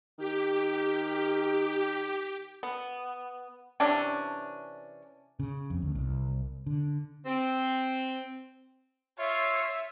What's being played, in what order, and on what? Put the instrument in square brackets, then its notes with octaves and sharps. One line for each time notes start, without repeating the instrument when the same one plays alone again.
[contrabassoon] D#3 [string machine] G4
[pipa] B3
C3 E3 C#4 D4
[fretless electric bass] C#3
F2
D2
C2
D3
[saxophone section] C4
[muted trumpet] F4 [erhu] C#5 [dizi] E5